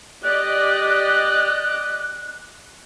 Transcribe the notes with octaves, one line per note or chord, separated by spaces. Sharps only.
G4 D5 D#5 F#6